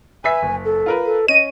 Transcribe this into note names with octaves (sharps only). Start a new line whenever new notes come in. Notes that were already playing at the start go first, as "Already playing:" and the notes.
B4 E5 G#5 B6
F#1
A4
F4 A#4 B4
A4
C#4 D#5 D#7